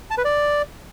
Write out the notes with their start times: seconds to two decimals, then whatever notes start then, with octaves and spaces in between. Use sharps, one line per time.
0.11 A5
0.18 B4
0.25 D5